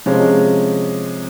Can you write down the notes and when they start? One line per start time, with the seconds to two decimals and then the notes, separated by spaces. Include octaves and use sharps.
0.06 C3 F3 G#3 C#4